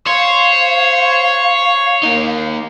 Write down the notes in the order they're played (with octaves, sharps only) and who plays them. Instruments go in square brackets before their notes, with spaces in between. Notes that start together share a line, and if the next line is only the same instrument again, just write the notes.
[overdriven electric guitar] C5 [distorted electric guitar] C#5 [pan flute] F5
[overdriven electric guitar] A#3 D#4